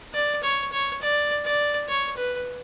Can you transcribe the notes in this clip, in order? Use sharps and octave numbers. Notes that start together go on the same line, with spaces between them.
D5
C#5
C#5
D5
D5
C#5
B4